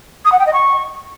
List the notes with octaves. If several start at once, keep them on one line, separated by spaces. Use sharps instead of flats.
D#6
F#5
G5
D#5
C#6